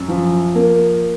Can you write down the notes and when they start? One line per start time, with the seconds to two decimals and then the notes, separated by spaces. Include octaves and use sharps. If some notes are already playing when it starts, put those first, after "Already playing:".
Already playing: F#2
0.08 F3
0.55 A#3